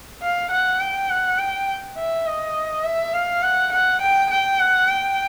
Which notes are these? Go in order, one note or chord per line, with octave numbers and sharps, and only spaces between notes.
F5
F#5
G5
F#5
G5
E5
D#5
E5
F5
F#5
F#5
G5
G5
F#5
G5